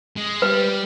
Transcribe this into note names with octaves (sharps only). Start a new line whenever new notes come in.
G#3
G3 B4